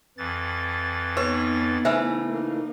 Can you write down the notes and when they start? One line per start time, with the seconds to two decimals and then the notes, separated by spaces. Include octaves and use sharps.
0.18 F2 E3 A6
1.17 B3 D#4 B4 C#5
1.85 C#3 E3 A3 B4 C5 E5
2.32 A#3 D#4